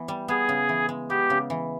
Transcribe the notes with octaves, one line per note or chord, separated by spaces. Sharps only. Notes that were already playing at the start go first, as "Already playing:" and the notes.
Already playing: E3 B3
G3
B3 G#4
C#3
E3
G#3
B3 G4
C#3
E3